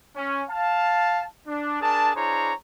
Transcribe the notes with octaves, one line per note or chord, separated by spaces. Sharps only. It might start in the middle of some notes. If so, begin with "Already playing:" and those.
C#4
F5 A5
D4
D4 G#4 A#4 A5
D4 E4 G#4 C5 C#5 A#5